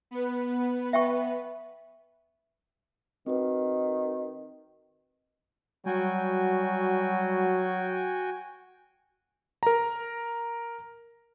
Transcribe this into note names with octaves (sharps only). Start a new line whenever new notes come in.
B3 B4
E5 G5 C#6
D#3 C4 F#4 B4
F#3 G3 F#4 G5 G#5
A#4 A#5